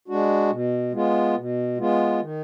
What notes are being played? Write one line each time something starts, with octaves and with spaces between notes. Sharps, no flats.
G#3 D4 F#4
B2
G#3 B3 F4
B2
G#3 B3 F4
D#3